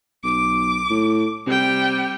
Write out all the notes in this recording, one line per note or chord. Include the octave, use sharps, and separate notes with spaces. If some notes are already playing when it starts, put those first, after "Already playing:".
B1 D6
A2
C3 G3 G5